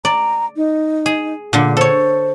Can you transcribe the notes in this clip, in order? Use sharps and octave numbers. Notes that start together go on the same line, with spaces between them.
D5 A#5
D#4
G#4
A#2 D3 F#5
A4 C5 C#5